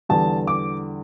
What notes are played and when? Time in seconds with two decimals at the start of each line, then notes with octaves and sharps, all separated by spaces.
0.09 E2 D3 G3 A5
0.47 D6